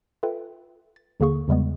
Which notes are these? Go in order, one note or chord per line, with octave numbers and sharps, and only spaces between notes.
F4 A4 B4 E5 G5
A6
D#2 D3 A#3 G#4 C#6
E2 C#3 G3 G#3 B3